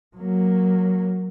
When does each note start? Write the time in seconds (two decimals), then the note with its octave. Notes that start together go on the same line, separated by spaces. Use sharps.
0.16 F#3 A#3